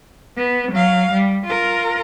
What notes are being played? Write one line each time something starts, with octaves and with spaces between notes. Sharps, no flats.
B3
F#3 F5
G3
F4 A#4